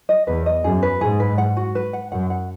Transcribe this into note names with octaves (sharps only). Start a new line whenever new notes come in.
D#5
E2 B4
D#5
F#2 G#4
B4
G#2 G#4
B4
F#5
F#4
B4
F#5
F#2 F#5
F#5